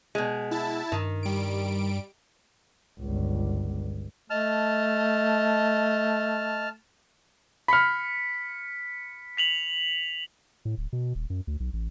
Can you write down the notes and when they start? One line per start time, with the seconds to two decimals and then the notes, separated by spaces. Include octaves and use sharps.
0.15 B2 G#3
0.51 E4 A5
0.92 G2 D#3
1.23 G3 D7
3.01 G1 C#2
4.30 A3 D#5 A5 F6
7.68 B5 F6 B6 C#7
9.37 B6 F7 F#7
10.65 A2
10.78 D1
10.93 B2
11.15 D#1
11.30 F#2
11.47 D2
11.60 B1
11.73 A1